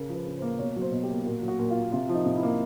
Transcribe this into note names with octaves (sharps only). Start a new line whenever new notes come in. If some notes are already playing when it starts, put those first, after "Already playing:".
Already playing: C#3 A#4
F3
B4
C#3
A#3 C5
B2 C#5
F#3
C5
B2
G4
A#3
A#2 F#4
F#3
F#4
A#2
F4
A#3
C3 F4
F3
D#4
C3
E4
A#3